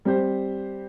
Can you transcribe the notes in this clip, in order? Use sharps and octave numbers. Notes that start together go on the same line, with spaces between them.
G3 C4 G4 C5